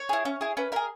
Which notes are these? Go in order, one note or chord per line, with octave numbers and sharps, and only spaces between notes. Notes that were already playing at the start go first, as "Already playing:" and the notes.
Already playing: C#5
E4 G#4
C#4
E4 G#4
C#4 B4
E4 G#4 A#4